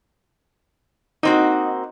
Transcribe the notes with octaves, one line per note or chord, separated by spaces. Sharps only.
A#3 C4 D#4 F#4 D#5 F#5